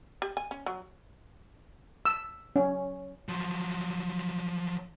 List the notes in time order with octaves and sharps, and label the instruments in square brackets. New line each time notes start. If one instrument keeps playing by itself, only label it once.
[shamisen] G4
G#5
C#4
F#3
[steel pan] E6
C#4
[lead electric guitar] F3 F#3